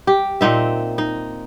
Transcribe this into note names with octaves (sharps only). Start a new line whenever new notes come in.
G4
A#2 C4 D#4 E5
D#4